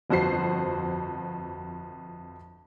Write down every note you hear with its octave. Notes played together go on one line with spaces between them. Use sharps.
G1 F2 F#4 C5 C7